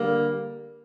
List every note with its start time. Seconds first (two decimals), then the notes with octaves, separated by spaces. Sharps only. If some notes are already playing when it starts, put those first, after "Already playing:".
Already playing: D3 G3 A#3